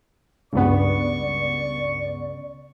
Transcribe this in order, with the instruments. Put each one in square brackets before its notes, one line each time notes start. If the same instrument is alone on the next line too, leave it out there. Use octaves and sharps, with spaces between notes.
[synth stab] C#2 G2 B3 [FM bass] C#3 [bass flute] D5 [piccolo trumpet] C#6